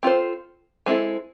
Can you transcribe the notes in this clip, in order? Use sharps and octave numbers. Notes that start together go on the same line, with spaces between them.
C4 F4 A4 C5
G#3 C4 E4 A4